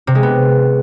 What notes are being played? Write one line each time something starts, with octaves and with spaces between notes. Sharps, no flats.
C3
G#3
B3